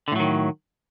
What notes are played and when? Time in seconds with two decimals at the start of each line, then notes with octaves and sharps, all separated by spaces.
0.08 D3
0.12 A2
0.16 F#3
0.20 D#3